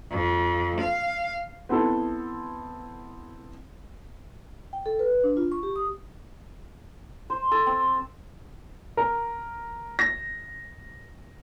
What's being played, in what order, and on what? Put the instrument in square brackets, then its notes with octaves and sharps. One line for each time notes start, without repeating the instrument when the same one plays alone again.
[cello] F2
F5
[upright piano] B3 C4 E4 A4
[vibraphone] G5
A4
B4
D4
F4
C#6
G4
D#6
[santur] C5
A4
C4
[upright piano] A#4
A#6